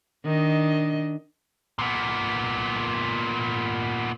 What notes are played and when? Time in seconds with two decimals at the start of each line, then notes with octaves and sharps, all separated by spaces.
0.25 D#3 D4 D#5
1.79 A#2 B3